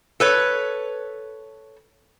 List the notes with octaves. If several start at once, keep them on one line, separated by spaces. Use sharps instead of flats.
A4 B4 C#5